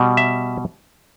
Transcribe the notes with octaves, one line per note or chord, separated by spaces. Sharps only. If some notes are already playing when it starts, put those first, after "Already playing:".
Already playing: B2 G3
E5